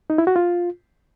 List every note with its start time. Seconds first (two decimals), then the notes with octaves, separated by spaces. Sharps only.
0.10 D#4
0.18 E4
0.27 F#4
0.36 F4